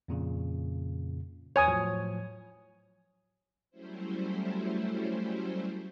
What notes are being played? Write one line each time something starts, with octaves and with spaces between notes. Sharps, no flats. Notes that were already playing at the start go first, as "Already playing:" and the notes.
F2 A#2 C#3
E2 B4 C#5 G#5 D#6
A2 F3 F#3
F#3 G3 A3 C#4 E4 C5